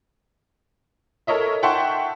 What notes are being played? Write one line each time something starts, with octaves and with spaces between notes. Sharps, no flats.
A4 A#4 C#5 D#5 E5
E5 F#5 G5 A5 C6 C#6